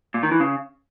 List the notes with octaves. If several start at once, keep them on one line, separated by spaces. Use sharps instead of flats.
A#2
D#3
E3
C#3